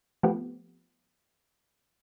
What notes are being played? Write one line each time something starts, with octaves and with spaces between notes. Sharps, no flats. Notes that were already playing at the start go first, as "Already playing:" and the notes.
F3 A3 B3 C4 G4